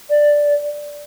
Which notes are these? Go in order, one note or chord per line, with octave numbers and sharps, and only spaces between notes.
D5